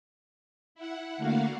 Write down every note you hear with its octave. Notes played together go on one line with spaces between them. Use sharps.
E4 F#5
D3 A3 A#3 F#4 F5